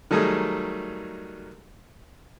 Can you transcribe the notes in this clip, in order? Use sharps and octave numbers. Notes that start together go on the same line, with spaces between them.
D#3 F#3 G3 A3 D#4 G#4